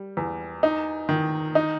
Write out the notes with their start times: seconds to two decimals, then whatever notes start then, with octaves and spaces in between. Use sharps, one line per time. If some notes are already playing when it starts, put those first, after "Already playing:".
Already playing: G3
0.17 E2
0.63 D#4
1.09 D#3
1.55 D#4